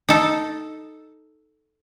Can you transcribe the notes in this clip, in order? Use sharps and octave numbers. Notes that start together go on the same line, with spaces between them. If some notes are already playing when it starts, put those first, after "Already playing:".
D#4 A4